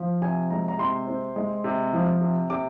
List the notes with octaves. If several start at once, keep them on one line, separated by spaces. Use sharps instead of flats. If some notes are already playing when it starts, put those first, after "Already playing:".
Already playing: F3
C3 G#5
G#3 A#5
A#5
C3 C6
C4
G#3
C3
F3
C3
C3 D6